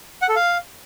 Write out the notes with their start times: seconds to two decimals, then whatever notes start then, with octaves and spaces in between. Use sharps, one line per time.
0.22 F#5
0.29 A4
0.36 F5